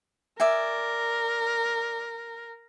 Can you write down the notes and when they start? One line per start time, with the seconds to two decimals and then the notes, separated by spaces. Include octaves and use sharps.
0.40 A#4 D5 E5 G#5